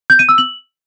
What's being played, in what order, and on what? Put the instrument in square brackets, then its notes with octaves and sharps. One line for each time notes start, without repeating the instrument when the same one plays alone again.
[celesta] G6
D#7
E6
F#7